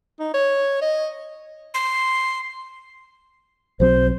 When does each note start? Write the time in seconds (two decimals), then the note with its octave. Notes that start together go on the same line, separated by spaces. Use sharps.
0.20 D#4
0.34 C#5
0.82 D#5
1.74 C6
3.80 B1 F#3 C4 C5